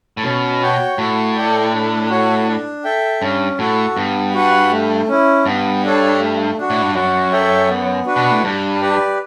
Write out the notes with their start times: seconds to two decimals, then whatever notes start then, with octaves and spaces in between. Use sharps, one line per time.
0.17 A2
0.23 B2 C#4
0.61 F#4 C#5 G5
0.98 A2 F#4
1.35 A4 D5 G5
1.72 D4
2.10 F#4 C#5
2.47 D4
2.84 A4 E5 G5
3.21 G2 C#4
3.59 A2 F#4 A4
3.96 G2 B3
4.34 F#4 B4 F#5
4.71 A3
5.08 C#4 E4
5.45 G2 B3
5.83 D4 A4 C#5
6.20 A3
6.57 D4 F#4
6.70 A2
6.82 G2
6.95 F#2 F#4
7.32 A4 C#5 E5 G5
7.69 B3
8.06 D4 F#4 B4
8.16 B2
8.31 A2
8.44 G2 D4
8.81 G4 B4 D5